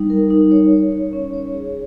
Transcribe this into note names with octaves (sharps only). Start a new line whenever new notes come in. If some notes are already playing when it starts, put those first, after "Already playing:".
Already playing: G3 D#4
A#4
D#4
C#5
C#5
C#5
C#4
C#5
G#4